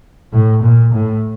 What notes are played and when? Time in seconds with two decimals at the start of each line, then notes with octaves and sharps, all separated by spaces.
0.33 A2
0.63 A#2
0.94 A2